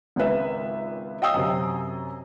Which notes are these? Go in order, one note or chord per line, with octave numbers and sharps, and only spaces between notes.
G#1 C#2 F4 B4 E5
D#5 F5 G5 D#6 E6 C7
F#2 C3